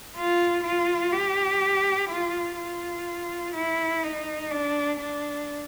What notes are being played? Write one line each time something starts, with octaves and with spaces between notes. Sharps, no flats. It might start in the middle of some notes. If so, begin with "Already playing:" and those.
F4
F4
G4
F4
F4
E4
D#4
D4
D4